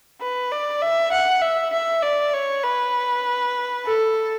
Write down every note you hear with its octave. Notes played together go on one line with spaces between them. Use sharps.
B4
D5
E5
F#5
E5
E5
D5
C#5
B4
A4